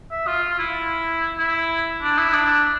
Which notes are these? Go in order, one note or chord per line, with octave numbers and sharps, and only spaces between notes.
E5
F4
F4
E4
E4
D4
E4
D4